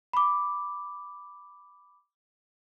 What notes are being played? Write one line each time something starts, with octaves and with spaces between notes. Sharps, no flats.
B5 D6